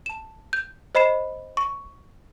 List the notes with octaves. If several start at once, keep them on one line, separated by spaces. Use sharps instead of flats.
A5 E7
G6
C5 D#5 B5 C7 E7
C#6